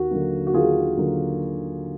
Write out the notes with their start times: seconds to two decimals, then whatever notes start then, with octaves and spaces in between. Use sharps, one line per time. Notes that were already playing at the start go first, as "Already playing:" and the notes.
Already playing: D#2 F#4
0.11 D3 F#3 A#3
0.47 F#4
0.54 D#2 F4 G#4
0.97 D3 F#3 A#3